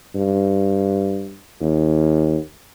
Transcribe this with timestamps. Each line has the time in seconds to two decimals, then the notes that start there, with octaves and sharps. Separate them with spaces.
0.15 G2
1.61 D#2